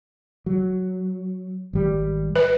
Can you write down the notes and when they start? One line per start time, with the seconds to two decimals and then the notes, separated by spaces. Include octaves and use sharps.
0.46 F#3
1.73 G#1 G3
2.36 B4